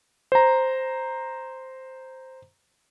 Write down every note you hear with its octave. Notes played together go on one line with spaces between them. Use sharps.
C5 A#5